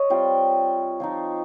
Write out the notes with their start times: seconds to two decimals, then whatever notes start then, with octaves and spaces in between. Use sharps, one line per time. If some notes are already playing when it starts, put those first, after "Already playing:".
Already playing: C#5 D#5
0.10 G3 C4 F4
1.00 F3 C4 D#4